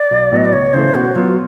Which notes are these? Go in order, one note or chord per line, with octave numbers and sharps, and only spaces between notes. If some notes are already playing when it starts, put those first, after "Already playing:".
Already playing: D5
B1
A2 F#3 B3 D#5
D5
C#2 C#5
C#3 E3 A3 C5
B2 F#4
F#3 B3 F4